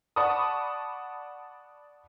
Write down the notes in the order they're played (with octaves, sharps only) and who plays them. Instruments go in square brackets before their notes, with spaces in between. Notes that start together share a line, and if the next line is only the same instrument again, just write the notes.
[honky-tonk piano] D5 F#5 A5 B5 C#6 D#6